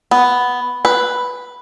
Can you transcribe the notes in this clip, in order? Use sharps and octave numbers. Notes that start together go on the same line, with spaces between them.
B3
B4